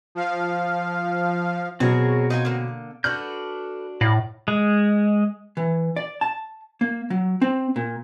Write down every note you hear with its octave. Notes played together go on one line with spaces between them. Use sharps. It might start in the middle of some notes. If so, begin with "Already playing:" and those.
F3 F5
B2 F#3 C4 F#4 G#4 A#4 C#5
D#4 F4 G#5
D3 A#3
D4 F#4 A4 B4 F6 G6
A2 D5 F5 A#5
G#3
E3
D5
A5
A#3
F#3
C4
A#2